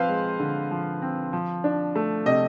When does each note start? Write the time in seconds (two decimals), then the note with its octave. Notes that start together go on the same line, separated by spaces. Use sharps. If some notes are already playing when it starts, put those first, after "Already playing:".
Already playing: F3 C4 B4 C5 F5
0.09 G#3
0.40 D3
0.71 F3
1.02 C4
1.33 F3
1.64 D4
1.96 A3
2.26 C3 D#5